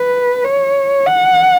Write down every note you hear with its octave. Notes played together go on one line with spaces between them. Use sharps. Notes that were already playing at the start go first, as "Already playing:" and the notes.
Already playing: B4
C#5
F#5